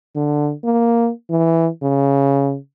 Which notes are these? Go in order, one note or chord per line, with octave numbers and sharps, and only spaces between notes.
D3
A#3
E3
C#3